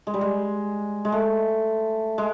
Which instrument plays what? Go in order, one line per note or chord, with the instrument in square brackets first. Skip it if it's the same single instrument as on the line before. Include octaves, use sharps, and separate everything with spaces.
[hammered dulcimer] G#3
G3
G#3
G#3
A3
G#3